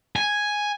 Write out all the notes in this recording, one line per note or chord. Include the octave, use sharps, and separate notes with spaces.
G#5